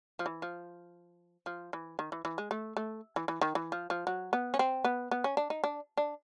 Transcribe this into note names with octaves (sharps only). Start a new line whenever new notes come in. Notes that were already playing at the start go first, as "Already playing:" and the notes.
F3
E3
F3
F3
E3
D#3
E3
E3
G#3
A3
A3
E3
E3
D#3
E3
F3
F3
F#3
B3
C#4
C4
B3
B3
C#4
D4
D#4
D4
D4